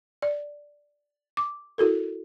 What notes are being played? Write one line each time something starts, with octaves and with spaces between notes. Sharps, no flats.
D5
D6
E4 F#4 A4 A#4